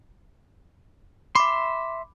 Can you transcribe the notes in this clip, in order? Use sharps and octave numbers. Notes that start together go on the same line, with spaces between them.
E5 B5 C6 D6